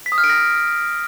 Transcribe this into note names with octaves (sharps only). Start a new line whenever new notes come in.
B6
D#6
F6
D7
A#6